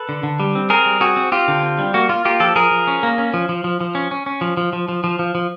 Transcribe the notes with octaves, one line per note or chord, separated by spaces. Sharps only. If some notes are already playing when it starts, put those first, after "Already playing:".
Already playing: A4 B4
D3
D3
G3
C4
C4 G#4 A#4
G3
C4 F#4 G#4
C4
C4 F4 G4
D3
C4
G3
A#3 F#4
A#3 F4
A#3 F4 G4
F3 G4 A4
F3 G#4 A#4
F3
C#4
A#3
C#4
F3
F3
F3
F3
C#4
C#4
C#4
F3
F3
F3
F3
F3
F3
F3